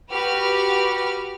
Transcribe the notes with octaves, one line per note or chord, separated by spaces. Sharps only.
F#4 G4 B4 F6